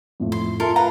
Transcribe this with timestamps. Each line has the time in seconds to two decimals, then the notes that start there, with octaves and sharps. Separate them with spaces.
0.20 F2 A2 F3
0.32 C6
0.60 F4 A4 A#4 E5 A5 C6
0.76 B4 F5 A#5